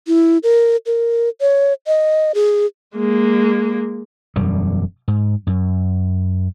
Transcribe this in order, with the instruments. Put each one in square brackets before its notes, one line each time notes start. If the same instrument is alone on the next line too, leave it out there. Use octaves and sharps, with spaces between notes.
[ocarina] E4
A#4
A#4
C#5
D#5
G#4
[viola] G#3 A#3
[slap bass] E1 F#2 G3
G#2
F#2